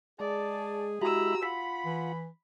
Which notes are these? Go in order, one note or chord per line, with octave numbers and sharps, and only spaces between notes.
G#3 G#4 D5 A5
G#3 E4 F#4 G4 A#5 B5 E6
F4 F#5 B5 B6
E3